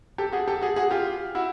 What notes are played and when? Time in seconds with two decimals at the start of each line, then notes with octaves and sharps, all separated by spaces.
0.18 G4 A4
0.32 F#4 G#4
0.48 G4 A4
0.62 F#4 G#4
0.76 F#4 G#4
0.91 F4 G4
1.35 E4 F#4